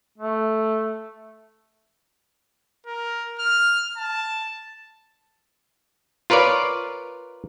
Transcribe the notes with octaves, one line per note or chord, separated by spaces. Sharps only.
A3
A#4
F6
A5
F4 A#4 B4 C#5 D5